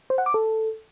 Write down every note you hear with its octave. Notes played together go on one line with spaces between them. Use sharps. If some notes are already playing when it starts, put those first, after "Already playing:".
C5
F#5
D6
A4